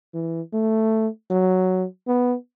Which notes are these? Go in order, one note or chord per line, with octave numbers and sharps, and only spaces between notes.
E3
A3
F#3
B3